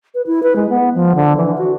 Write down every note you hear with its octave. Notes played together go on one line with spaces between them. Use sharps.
B4
E4
B4
G#3
B3
F3
D3
E3
F#4